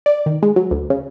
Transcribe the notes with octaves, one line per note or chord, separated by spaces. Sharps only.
D5
D#3
G#3
F#3
D2
C#3